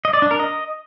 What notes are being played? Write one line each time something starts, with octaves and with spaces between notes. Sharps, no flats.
D#5
D5
D4
A#4
D#5